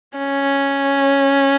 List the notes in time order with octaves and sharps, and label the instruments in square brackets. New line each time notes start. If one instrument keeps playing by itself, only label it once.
[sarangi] C#4